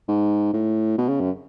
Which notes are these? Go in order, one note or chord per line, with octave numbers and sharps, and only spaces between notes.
G#2
A2
B2
C#3
F#2